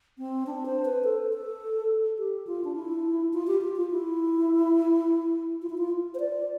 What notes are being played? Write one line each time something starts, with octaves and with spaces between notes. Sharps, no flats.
C4
D4
C5
B4
A4
A4
G4
F4
D4
E4
F4
G4
F4
F4
E4
F4
E4
F4
C5
D5